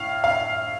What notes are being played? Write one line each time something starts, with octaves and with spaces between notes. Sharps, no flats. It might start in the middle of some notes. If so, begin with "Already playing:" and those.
Already playing: A2 F5
F5